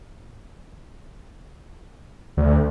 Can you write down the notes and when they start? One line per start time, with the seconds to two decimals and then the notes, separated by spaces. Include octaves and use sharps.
2.37 D2